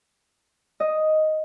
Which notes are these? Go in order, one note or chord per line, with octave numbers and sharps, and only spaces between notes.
D#5